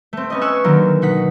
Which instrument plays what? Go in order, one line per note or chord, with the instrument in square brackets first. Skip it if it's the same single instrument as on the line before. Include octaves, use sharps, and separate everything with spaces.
[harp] A3 C4
B3 C#4 D#5
G#5 C#6 E6 F#6
D3 D#3 F#3 A#3
B2 D#4 F#5 B6